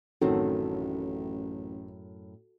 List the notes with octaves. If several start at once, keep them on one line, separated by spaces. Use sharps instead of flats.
A1 F#2 A2 D#3 C4 F#4 A4